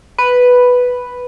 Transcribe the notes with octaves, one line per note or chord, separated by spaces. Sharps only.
B4